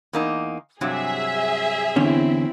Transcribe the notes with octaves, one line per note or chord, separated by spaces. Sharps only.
E2 A#3 D#4
G2 C3 F#3 G#4 E5
E2 D3 C4 C#4 E4